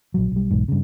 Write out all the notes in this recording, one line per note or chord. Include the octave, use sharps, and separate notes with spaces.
A#1 F#3
B1 G3
B1 E2 G#2
G2 C#3